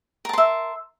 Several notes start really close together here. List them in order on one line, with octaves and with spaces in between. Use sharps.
A#4 A5 C6 E5